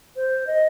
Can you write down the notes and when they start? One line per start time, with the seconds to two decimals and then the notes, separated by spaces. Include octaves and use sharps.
0.16 C5
0.47 D#5